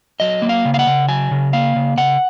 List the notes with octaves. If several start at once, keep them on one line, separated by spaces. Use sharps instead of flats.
F#3 D#5
A#3
F5
C#3
F5
F#5
C#3
F#3 G#5
C#3
A#3 F5
C#3
C#3 F#5